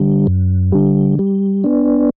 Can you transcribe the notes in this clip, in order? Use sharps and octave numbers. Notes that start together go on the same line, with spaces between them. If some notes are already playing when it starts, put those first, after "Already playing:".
Already playing: D3 G3
F#2
D3 G3
G3
B3 D4